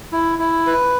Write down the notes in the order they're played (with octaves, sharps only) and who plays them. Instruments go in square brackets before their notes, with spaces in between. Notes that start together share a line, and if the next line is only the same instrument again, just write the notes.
[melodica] E4
E4
B4